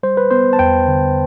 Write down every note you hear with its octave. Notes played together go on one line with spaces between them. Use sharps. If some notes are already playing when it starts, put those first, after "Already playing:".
G3 C5
B4
B3 C5
A5
E2 G5
D3